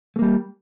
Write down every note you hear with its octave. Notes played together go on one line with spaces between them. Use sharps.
G3 A3 A#3